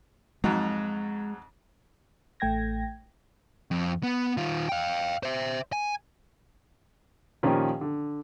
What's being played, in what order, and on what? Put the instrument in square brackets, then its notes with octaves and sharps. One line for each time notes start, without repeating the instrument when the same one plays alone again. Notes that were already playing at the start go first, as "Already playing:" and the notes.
[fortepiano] F2 G#2 F#3 [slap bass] G#3
[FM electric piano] A1 A3 G5 G#6 A#6
[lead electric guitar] F2
B3
D#3 F4
F5 G5
C5 E5
G#5
[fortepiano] A#2 D#3 F3 C#4 G4
D3